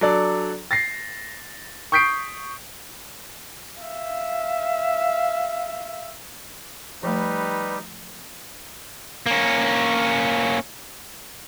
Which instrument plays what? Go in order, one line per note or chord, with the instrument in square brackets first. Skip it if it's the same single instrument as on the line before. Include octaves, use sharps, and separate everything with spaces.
[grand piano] F#3 D4 A4 D5
A6 A#6 C7
C#6 D#6 G6 B6 C7 D7
[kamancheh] E5 F5
[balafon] F3 A3 [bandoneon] G3 G4 [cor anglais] D#4 [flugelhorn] B4
[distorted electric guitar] A#3 C#4